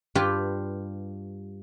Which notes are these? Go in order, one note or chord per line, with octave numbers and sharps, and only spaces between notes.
G2 F4 G4 B4 G5